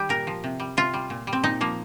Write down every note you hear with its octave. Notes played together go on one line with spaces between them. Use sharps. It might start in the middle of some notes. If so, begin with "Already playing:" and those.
Already playing: D#3 G3 G4
A#2 A#4
F3
C3
G3
C3 F4
G3
A#2
G3
C4
A#2 D#4
F3 A#3